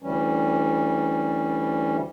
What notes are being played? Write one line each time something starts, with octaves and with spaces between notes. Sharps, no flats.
D2 E3 G3 C#4